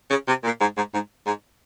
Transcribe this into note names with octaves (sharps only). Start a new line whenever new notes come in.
C#3
C3
A#2
G#2
G#2
G#2
G#2